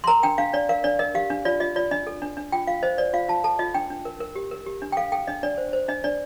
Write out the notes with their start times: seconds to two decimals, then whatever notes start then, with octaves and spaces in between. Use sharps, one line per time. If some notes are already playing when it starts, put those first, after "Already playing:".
0.04 C6
0.07 A#4 A#5
0.23 D4 G5
0.38 D4 F5
0.53 D4 D5
0.69 A#4 F5
0.84 D4 D5
0.99 A#4 D#5
1.15 G4 F5
1.30 D4
1.45 F4 D5
1.60 F4 D#5
1.76 F4 D5
1.91 D4 D#5
2.07 A4
2.22 D4
2.37 D4
2.52 F4 G5
2.67 F4 F5
2.83 C5 D#5
2.98 C5 D5
3.13 F4 F5
3.28 F4 A5
3.44 A4 A5
3.59 F4 D#5
3.74 D4 G5
3.90 D4
4.05 A#4
4.20 A#4
4.36 G4
4.51 A#4
4.66 G4
4.82 D4
4.92 G5
4.97 A4 F5
5.12 A4 G5
5.27 D4 D#5
5.43 D4 D5
5.58 C5
5.73 C5
5.88 D4 D#5
6.04 D4 D5